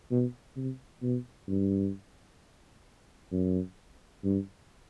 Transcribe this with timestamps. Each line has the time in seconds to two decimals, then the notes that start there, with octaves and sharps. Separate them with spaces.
0.11 B2
0.56 C3
1.02 B2
1.48 G2
3.32 F#2
4.24 G2